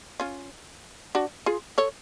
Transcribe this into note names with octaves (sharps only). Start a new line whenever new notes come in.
C#4 F4
D4 F#4
F4 G#4
A4 C#5